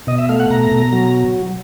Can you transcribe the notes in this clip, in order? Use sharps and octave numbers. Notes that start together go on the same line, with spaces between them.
B2 D#5
E5
A3 F5
F#5
B2 A#5
B2
F#3